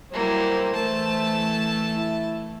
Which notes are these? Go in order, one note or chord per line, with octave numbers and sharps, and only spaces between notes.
F#3 G3 A#3 E4 C5
E3 A3 A5
E4